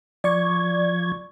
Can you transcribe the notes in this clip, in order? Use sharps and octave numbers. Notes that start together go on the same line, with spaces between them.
F3 D5 C#6 G#6